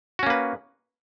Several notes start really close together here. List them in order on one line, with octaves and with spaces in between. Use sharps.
F#4 C#4 A#3 B4